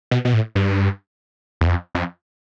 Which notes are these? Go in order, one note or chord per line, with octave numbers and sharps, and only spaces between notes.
B2
B2
A2
G2
E2
F2
F2